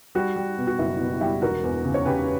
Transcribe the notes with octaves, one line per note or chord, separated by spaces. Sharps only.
G3 F#4
G3
B2
F#4
F#1 E4
B2
G3 E4 G4
E1 F#4 A#4
E2
C#3
C#5
C#3 G4 B4